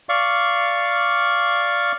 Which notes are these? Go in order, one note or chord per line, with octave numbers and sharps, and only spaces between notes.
D5 F5 C#6